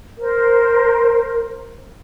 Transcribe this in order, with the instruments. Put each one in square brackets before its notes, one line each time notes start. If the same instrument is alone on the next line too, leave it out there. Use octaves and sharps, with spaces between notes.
[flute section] A#4 C5